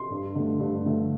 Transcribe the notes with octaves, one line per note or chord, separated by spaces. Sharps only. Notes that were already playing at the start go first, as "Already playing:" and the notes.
Already playing: C6
G2
D3 A3
G2
D3 A3